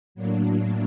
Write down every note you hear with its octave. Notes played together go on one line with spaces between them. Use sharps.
A2 F#3 A#3 D4